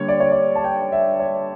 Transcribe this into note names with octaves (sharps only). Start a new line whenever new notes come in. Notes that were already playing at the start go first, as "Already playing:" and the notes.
Already playing: D3 G3 A#3 C#5
D5
C#5
D5
A5
G5
E5
C#5